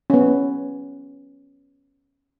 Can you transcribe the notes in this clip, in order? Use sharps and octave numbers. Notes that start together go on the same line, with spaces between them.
B3 C#4